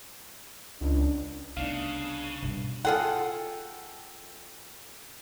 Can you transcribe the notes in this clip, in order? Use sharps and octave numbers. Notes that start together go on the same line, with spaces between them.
C#2 D4
C2 C#3 A3 B3 D4 D#4 F5
G2 B2 D4
F4 G#4 A4 F#5 G5